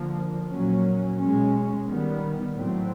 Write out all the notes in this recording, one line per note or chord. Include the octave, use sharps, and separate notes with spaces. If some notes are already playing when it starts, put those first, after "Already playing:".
Already playing: D3 F3 A#3
A#2 F#3 A#3 C#4
B2 G#3 C#4
D#3 G3 B3
A2 F#3 A3 C4